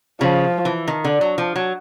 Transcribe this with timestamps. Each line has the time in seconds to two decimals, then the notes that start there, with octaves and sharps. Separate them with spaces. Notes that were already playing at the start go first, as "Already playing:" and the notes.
0.21 C#3 F3
0.65 E3
0.88 D#3
1.05 D3
1.21 F#3
1.38 F3
1.56 F#3